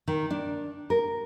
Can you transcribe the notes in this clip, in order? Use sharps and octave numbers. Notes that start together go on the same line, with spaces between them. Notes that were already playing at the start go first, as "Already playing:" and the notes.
D#3
D4
A#4